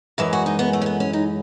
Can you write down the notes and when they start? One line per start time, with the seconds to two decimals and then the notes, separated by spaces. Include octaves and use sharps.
0.18 F#2 E3 G#3 E5
0.33 F#4
0.46 D#4
0.59 B3
0.73 A3
0.82 C#4
0.86 B3
1.00 C#4
1.13 D#4